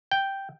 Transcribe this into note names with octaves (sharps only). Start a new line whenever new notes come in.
G5